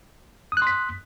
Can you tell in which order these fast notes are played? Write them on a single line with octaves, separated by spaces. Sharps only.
D#6 F#6 C6 B6